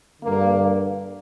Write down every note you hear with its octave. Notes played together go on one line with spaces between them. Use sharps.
G2 D3 A#3